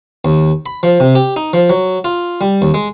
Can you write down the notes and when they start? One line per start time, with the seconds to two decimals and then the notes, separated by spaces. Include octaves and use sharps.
0.25 D#2
0.66 B5
0.83 F3
1.00 C3
1.15 G4
1.36 D#4
1.53 F3
1.70 F#3
2.04 F4
2.41 G3
2.62 D#2
2.74 G#3